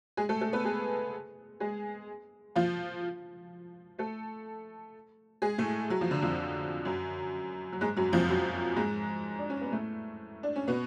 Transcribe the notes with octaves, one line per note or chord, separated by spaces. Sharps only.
G#3 G#4
A3 A4
A3 A4
B3 B4
G#3 G#4
G#3 G#4
F3 F4
A3 A4
G#3 G#4
A2 A3
F#3
F3
D3
F2 F3
F#2 F#3
F#3
G#2 G#3
F#2 F#3
F2 F3
F#2 F#3
G#2 G#3
D4
C#4
B3
A2 A3
D4
C#4
B2 B3